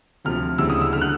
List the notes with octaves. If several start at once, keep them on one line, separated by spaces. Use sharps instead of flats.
D2 C3 F3 F6
D2 C#3 E3 G3 E6
D#6
E6
D3 G3 F6
F#6